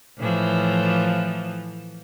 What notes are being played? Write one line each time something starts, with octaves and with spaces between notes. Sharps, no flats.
A2 E3 F3